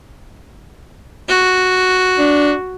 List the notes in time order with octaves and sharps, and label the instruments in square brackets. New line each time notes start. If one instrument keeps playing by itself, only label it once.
[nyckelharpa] F#4
[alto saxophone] D4